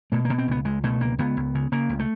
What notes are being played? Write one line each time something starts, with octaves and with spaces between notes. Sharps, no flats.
B2 A3
B2 A#3
C4
C#2 B3
C#2 G#3
B2 A3
C#2 A#3
C#2 B3
C#2
C#3
C#3 A#3
C#2
A3